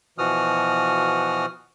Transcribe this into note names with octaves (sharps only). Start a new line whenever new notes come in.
B2 E3 F3 F#4 D#6 F6